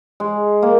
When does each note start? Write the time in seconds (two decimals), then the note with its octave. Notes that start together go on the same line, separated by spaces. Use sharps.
0.20 G#3
0.62 A#3